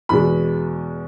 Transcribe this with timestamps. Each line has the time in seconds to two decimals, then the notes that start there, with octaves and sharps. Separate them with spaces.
0.09 E2 B2 G#3 B5